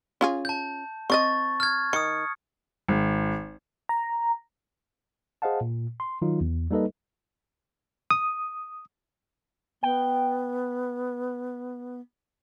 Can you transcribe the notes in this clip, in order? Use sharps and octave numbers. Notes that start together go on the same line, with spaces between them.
C#4 F4 G#4
A5 G6
C4 D5 D#5 C#6 A6
F6 G#6
D#3 D#6 C#7
G#1
A#5
G#4 C5 D#5 F5 F#5 A5
A#2
C6
D#3 F#3 D#4 F4
E2
G3 A#3 D#4 A4 B4 D#5
D#6
B3 G5